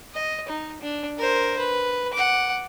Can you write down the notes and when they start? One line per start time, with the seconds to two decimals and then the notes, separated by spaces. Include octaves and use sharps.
0.14 D#5
0.49 D#4
0.82 D4
1.18 A#4 C5
1.59 B4
2.13 F#5 D6